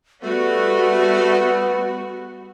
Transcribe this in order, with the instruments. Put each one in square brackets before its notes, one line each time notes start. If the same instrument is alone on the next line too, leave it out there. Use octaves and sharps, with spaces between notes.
[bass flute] G3 [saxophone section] A3 [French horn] B3 [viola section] F#4